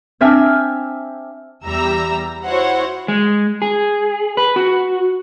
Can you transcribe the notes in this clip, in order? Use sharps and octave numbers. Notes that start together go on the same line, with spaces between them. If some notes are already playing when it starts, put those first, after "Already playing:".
C4 D4 E5 G#5 F6
E2 G3 E5 A#5 E6
E4 F#4 C5 C#5 F#5
G#3
G#4
B4
F#4